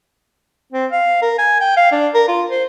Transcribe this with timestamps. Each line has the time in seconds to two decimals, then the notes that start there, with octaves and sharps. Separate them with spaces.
0.73 C4
0.92 F5
1.22 A#4
1.39 G#5
1.60 G5
1.77 F5
1.92 D4
2.14 A#4
2.28 F4
2.50 C5